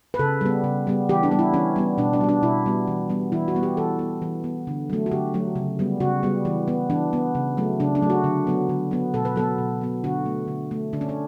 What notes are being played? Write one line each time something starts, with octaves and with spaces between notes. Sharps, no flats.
B4
C#3 A4
G3 B3
C#3
G3 B3
E3 G4
D4
G3 B3
E4
E3 C#4
G3 B3
B2 D4
D4
G3 B3
D4
B2 E4
G3 B3
E3
G3 B3
E3 E4
F#4
G3 B3
G4
E3 A4
B3
E3
B3
D3
F#3 A3
F#4
D3 G4
F#3 A3
C#3
G3 B3
C#3 F#4
G3 B3
E3
B3
E3 D4
B3
C#3
F#3 A3
C#3 D4
D4
F#3 A3
F#4
D3
F#3 B3
D3
F#3 B3
B2 A4
B4
F#3 B3 A4
B2
F#3 B3
D3 F#4
A3
D3
A3
D3 D4
C#4
D4